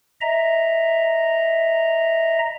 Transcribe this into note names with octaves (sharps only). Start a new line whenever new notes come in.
D#5 E5 A#5